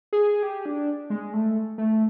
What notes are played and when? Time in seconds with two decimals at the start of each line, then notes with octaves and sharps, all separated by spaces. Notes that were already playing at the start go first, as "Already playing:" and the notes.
0.13 G#4
0.43 G4
0.66 D4
1.10 G#3
1.33 A3
1.78 A3